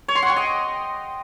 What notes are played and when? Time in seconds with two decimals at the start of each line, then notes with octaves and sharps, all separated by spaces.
0.08 C#5
0.15 C6
0.22 F#5
0.29 G5
0.36 D#5